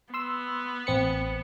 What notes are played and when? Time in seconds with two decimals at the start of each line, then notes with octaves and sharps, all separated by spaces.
0.14 B3 C6 E6
0.87 A1 C4 C#7